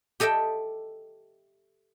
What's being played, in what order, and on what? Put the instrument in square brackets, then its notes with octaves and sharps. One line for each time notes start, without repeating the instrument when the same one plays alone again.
[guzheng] G4 A4 D#5 E5 G5